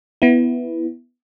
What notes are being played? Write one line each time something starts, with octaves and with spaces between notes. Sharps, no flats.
B3 E4